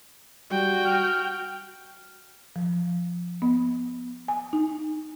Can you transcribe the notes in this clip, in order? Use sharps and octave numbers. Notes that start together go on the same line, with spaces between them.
G3 F#4 G5
F6
F3
B3
G#5
D#4